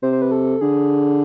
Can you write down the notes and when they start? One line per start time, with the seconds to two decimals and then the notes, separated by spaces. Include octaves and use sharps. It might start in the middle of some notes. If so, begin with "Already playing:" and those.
0.03 C3 C5
0.13 C5
0.22 B4
0.31 A4
0.61 D3 G#4